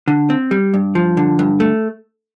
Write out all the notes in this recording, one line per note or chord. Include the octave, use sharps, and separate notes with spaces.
D3
C4
G3
G2
F3
D3
G2
A3